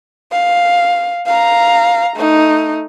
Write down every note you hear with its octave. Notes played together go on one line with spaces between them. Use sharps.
F5
F5 A#5
A3 D#4